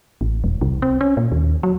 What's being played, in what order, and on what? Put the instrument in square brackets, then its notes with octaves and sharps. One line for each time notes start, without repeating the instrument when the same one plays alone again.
[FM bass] A1
E1
C2
C4
C#4
A#2
D#2
F#3